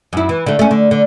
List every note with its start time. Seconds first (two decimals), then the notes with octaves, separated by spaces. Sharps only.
0.13 F#2 E4
0.29 E3
0.46 D3 A3
0.59 A3 C#4
0.71 D3
0.91 D3